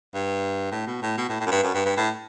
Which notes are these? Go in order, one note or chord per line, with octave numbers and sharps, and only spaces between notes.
G2
A2
B2
A2
B2
A2
A2
F#2
G2
F#2
G2
G2
A2